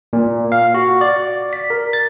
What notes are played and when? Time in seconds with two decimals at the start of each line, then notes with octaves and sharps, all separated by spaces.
0.13 A#2
0.52 F5
0.74 F#4
1.01 D5
1.53 B6
1.70 A#4
1.93 A6